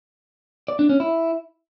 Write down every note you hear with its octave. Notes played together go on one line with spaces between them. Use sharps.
D5
D4
C#4
E4